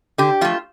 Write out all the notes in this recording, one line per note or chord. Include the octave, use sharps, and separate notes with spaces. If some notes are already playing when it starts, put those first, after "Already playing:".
D3 G4
F3 A3 F4